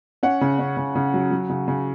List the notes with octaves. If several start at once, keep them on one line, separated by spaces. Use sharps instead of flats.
C#4 F#5
C#3
C#4
C#3
C#3
F#3
F#3
C#3
C#3